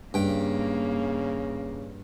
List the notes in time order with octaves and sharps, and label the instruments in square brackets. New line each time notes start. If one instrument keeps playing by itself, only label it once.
[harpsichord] G2 G5 [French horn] C#3 [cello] A#3